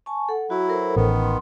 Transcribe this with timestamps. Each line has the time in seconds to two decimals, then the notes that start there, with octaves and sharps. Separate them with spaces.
0.06 G#5 A5 C#6
0.29 A4 F#5
0.50 F#3 E4 F#4
0.68 A4 A#4 C5
0.96 A1 D#3 B3
1.22 C6